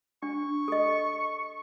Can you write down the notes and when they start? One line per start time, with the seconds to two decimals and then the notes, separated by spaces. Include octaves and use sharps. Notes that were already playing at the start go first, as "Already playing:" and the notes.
0.23 D4 C#6
0.68 A4 D#5